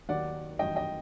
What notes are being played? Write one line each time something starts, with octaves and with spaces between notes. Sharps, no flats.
D#2 D#3 F#3 D5 F#5
A1 G2 D#3 F#3 D#5 G5
D#5 G5